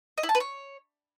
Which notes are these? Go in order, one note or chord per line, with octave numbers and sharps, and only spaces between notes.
D#5
E4
A5
B4
C#5